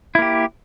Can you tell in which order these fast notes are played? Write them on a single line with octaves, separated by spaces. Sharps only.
E4 A#3 G4